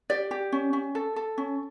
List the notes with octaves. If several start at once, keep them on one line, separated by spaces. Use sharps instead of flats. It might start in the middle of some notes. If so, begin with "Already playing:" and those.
G4 D5
G4
C#4
C#4
A4
A4
C#4